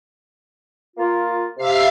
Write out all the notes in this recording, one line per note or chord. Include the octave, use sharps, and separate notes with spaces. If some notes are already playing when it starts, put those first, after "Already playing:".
A#3 F4
C3 E5 F5 C7